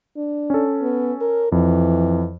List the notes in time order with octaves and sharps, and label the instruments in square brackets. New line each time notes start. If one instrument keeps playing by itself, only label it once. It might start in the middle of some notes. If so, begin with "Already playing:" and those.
[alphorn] D4
[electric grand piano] C#4 A4
[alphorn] B3
A#4
[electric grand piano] F2 [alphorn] E3